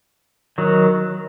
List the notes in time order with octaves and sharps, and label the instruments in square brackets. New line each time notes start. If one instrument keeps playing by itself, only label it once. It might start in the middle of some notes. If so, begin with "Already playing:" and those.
[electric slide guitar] D#3 F#3